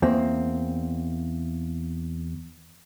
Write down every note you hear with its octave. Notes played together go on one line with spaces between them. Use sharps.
E2 A#3 C4